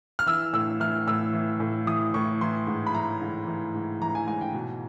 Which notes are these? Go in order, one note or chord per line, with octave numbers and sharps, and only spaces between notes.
F6
E3 E6
A2 E6
E3 F6
A2 E6
E3
A2
E3 D#6
A2 C#6
E3 C6
G#2
B5
E3 A#5
G#2
E3
G#2
E3 A#5
G#5
G#2 G#5
G5
B2